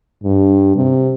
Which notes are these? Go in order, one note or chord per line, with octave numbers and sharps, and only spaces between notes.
G2
C3